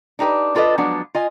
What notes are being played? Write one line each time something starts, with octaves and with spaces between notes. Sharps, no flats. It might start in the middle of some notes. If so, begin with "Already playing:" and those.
D4 D#4 G4 A#4 B4
D4 F4 A4 B4 D#5
F3 F#3 G#3 B3 D4
F4 D#5 G#5